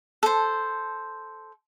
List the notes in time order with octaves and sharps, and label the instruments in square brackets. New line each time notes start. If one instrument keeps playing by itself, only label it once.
[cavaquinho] A4 C5